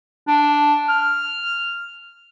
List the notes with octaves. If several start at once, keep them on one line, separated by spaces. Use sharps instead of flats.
D4
F6